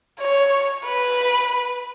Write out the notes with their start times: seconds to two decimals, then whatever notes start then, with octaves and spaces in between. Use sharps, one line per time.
0.20 C#5
0.85 B4